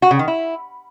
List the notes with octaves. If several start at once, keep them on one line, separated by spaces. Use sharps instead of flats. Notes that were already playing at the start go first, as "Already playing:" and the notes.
F#4
C#3
D#3
E4